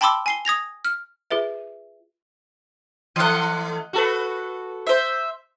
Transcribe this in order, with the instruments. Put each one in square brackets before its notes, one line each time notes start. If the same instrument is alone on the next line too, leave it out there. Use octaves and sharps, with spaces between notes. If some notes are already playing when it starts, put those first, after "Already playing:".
[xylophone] G5 A5 B5 C6 D6 E6
G#5 C7 G7
D#6 G#6 A#6 F7
F6
[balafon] F4 G#4 B4 E5
[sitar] E3 A3 [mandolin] D#5 F#5
[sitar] F#4 A4 B4
[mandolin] C5 E5